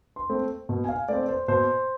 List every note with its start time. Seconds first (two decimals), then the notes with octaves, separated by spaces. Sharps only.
0.16 C6
0.30 A3 C4
0.69 B2
0.84 G#5
0.89 F5
1.09 A3 C4 D5
1.28 C5
1.48 B2 C5